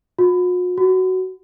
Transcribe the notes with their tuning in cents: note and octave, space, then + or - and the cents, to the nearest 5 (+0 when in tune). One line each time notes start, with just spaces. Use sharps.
F#4 -45
F#4 +10